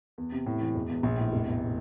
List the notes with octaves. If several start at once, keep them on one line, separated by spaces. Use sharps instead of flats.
E2
C3
A2
E3
E1
E2
A#1
A2
F1
E2